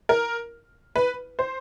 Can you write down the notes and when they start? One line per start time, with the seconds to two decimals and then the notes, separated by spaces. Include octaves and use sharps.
0.09 A#4
0.96 B4
1.39 C5